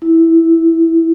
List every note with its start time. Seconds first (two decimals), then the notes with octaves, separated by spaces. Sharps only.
0.02 E4